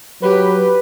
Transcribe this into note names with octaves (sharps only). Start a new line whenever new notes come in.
F#3 G4 B4